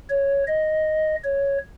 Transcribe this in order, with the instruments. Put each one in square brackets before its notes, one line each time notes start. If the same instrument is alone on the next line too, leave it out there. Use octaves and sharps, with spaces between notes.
[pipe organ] C#5
D#5
C#5